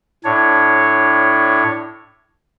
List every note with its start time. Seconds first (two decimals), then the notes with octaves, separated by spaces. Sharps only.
0.25 A2 D4 C#5